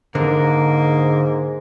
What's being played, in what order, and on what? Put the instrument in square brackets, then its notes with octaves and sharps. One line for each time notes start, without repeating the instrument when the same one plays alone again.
[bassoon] G#2 [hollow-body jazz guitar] D3 [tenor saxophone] A#3